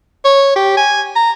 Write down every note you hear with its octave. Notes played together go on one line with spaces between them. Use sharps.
C#5
G4
G#5
A#5